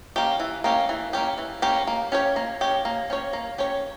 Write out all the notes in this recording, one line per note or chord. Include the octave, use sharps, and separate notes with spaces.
A#3 C#4 G4
E3
A#3 C#4 G4
E3
A#3 C#4 G4
E3
A#3 C#4 G4
A#3
C#4 G4 C#5
A#3
C#4 G4 C#5
A#3
C#4 G4 C#5
A#3
C#4 G4 C#5